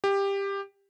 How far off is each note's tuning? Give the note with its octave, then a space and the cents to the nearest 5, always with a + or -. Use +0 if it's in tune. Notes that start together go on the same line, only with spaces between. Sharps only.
G4 +15